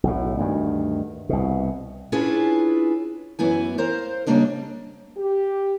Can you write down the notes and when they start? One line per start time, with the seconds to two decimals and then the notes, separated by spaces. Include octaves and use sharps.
0.03 B1 A2
0.39 D2 G2 D#3
1.29 C2 B2
2.12 C#4 D4 E4 F4 G#4 B4
3.39 F#2 E3 B3 E4 G#5
3.78 A#4 C5 F5
4.27 C#3 E3 G3 A#3 D4 D#5
5.17 G4